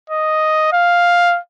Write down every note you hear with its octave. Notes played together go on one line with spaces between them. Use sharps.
D#5
F5